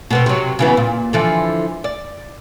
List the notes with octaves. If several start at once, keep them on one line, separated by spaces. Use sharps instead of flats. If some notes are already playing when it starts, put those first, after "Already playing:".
B2 B3 C4
C3 F#3
C#3 E3 B3
A#2
D3 E3 F3
D5